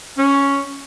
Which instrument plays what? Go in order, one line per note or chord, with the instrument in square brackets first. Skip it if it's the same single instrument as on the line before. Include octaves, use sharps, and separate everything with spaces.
[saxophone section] C#4